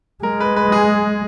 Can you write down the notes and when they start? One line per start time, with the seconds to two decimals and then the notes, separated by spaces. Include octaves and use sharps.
0.23 G#3 A#4
0.40 B4
0.56 B4
0.72 G#4